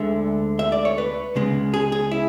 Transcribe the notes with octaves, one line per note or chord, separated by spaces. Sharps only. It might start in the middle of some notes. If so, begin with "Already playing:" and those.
Already playing: D2 D3 G#3 E5
E5
D5
C#5
B4
C#2 C#3 G#3
G#4
G#4
E4